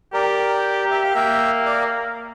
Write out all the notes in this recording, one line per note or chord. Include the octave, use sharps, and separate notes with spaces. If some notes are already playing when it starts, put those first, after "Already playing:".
G4 A#4 D5
E5
F5
A#3 E5 G5
D5 F5